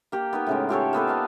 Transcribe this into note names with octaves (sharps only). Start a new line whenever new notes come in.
A#3 G4
B3 D#4 A#4
A2 C#3 G#3
F4 G4 A4 C#5
A#3 B3 A4 B4
D5 D#5 F5